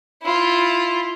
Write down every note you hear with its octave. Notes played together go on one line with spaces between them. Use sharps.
E4 F4